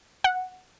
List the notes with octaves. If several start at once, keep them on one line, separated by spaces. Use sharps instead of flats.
F#5